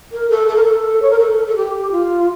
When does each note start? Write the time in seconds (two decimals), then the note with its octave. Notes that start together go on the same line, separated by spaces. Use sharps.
0.12 A#4
0.30 A4
0.48 A4
0.56 A#4
0.64 A4
1.02 C#5
1.10 A#4
1.20 A4
1.47 A4
1.56 G4
1.92 F4